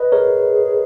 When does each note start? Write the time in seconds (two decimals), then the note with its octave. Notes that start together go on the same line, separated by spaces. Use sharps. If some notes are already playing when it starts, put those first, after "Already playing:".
Already playing: B4 D#5
0.12 G#4 A#4 C#5